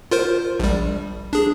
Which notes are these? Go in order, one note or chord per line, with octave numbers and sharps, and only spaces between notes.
F4 A#4 C5
A#1 G3
D4 G#4